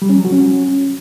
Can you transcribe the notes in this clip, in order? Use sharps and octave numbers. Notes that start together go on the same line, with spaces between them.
G3
C#4
F#3
F#4
C#4